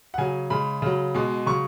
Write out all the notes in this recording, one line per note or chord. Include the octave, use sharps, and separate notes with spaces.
F#5
C#3 F#3 G#5
C#3 G#3 B5
C#3 F#3
B2 G#3
C#3 F#3 C#6